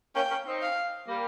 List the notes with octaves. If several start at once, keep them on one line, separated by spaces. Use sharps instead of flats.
A#3 C#4 G5
A#3 C#4
C4 D#4
F5
G3 A#3